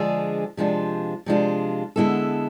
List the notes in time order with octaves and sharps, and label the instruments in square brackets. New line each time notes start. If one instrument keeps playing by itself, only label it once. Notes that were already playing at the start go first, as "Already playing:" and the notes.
Already playing: [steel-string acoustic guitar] D3 F3 G#3 D4 G#4
C3 F3 G#3 D4 F4
C3 F3 G#3 D4 F4
D3 G#3 B3 E4 A4